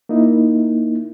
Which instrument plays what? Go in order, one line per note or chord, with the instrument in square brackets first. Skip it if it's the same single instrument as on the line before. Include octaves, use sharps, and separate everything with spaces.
[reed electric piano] A#3 D#4 E4